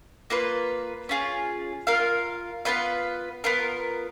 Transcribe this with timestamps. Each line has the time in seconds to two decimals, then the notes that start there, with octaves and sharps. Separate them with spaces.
0.30 A#3 F4 B4
1.09 C#4 F4 G#4
1.87 F4 A#4 F5
2.65 B3 F4 B4 F5
3.44 B3 F4 A#4